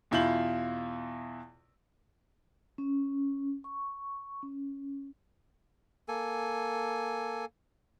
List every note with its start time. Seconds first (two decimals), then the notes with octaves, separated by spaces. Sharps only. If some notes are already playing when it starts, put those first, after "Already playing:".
0.11 E2 B2 E4 F4 G6 F#7
2.78 C#4
3.64 C#6
4.43 C#4
6.08 A#3 A4 G#5